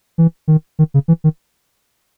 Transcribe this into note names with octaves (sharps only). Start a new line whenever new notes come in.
E3
D#3
D#3
C#3
E3
D#3